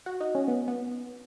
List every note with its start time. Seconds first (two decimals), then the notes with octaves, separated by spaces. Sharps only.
0.06 F#4
0.21 D#4
0.35 C#4
0.48 B3
0.68 B3